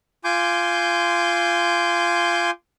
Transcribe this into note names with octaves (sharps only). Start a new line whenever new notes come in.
F4 G#5 C6 D6 G6